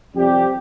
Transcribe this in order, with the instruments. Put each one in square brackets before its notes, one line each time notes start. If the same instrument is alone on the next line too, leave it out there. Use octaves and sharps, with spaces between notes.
[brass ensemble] F2 C3 G3 C4 G4